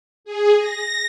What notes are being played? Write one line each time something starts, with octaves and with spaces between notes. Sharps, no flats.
G#4
A#6